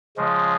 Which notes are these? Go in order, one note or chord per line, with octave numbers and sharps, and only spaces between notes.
C#3 F3 G#3